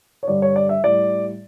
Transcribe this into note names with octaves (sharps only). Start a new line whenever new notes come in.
C#5
G2 D3 G3 D5
C#5
D5
E5
A2 G3 D5